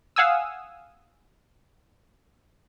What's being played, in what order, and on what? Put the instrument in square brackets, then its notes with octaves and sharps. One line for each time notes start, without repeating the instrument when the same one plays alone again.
[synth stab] F5 F#5 G#5 D#6 E6